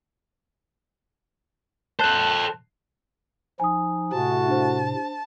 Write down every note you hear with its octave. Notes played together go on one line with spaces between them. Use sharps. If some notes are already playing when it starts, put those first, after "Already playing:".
A4 C5 A5 F#6
F3 D#4 G#5 D#6
A2 C3 A3 E4 F#4 A5
D4 C5